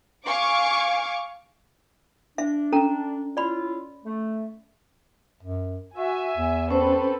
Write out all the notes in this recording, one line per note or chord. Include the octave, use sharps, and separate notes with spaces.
F5 G#5 C#6 D6
D4 E5
C#4 A4 A#5
C#4 E4 F4 D5 B5
A3
F#2
F#4 E5 G#5
E2
C4 C#4 A4 B4 C5